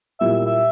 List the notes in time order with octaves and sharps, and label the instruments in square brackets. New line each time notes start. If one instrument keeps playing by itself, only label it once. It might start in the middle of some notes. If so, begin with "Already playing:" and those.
[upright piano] A#2 G3 A#3 E4 G4 [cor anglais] E5
[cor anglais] E5
E5